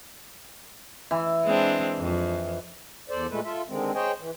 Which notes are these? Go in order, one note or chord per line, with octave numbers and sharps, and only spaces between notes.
E3
G#3 C4 D4
F2
E2 A4 C5 D5
A#2 G#3 A3 A4 B4
F4 A4 E5
D3 D#3 G#3 C4
G#4 C5 C#5 D#5 G5 G#5
E3